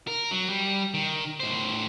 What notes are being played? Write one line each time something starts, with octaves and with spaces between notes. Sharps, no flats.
A#4
F#3
G3
D#3
A2 C5